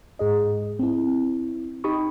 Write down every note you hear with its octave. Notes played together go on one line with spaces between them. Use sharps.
G#2 G#4 D#5
C4 E4
D#4 G4 B5 C#6 D#6